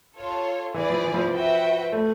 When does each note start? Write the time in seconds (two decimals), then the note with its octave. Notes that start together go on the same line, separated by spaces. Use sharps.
0.16 F4 A4 C#5
0.74 E3 G#4 B4 D5
0.90 F3
1.04 E3
1.14 F3
1.24 F3
1.34 F#4 B4 E5 G5
1.92 A3